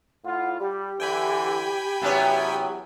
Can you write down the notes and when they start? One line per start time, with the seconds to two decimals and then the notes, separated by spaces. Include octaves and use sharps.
0.25 A2 F4 F#5
0.60 G3 G4
1.00 D3 E3 G5 G#5 B5
2.02 E2 C3 F#3 B3 C#4